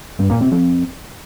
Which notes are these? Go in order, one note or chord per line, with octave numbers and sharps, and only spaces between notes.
G2
A#2
C3
F2